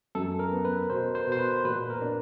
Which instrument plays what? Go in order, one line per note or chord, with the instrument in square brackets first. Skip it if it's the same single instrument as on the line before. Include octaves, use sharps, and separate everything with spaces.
[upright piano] F#2 [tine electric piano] A4
[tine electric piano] A#4
[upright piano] B3
[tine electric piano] B4
[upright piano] B2 [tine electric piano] C5
[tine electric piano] C5
[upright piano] B2
[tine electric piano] C5
B4
[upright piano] A#2 [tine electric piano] B4
[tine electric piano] A#4
[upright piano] D4